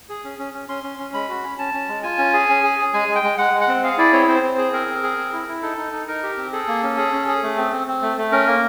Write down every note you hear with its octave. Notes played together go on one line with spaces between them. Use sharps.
G#4
C#4
C#4
C#4
C#4 C6
C#4
C#4
G#3 B5
F#4
C#4
C#4 A5
C#4
G#3
F4 G#5
C#4
G#4
C#4
G#4
G#4
G#3 G#5
G#3
G5
G#3
G#3 F#5
G#3
F#5
C4
G#4 F5
E4 D5
C4 C#5
C4 C5
C4
G#4
C4 A#4
C4
G#4
C4
E4
E4
D#4 A4
D#4
D#4
D#4 A#4
G4
C4
G#4 A4
A#3
C#4
G#4
C#4
G#4
A3
C4
C4
C4
A3
A3
C#4 A#4
A#3